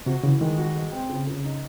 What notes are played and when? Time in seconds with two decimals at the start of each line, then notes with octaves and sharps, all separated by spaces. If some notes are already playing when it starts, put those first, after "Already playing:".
0.06 C3 F#4
0.23 C#3 E3
0.41 D#3 G#3
0.58 F#4
0.75 G#3
0.92 C4
1.09 C#3
1.27 C#3
1.44 D#4